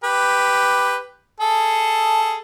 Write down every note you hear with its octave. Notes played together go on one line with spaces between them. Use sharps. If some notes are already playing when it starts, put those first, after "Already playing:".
G4 B4
G#4 A4